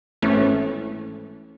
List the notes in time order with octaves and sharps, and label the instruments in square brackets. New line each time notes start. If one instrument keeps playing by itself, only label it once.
[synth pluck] G#1 E3 A3 C#4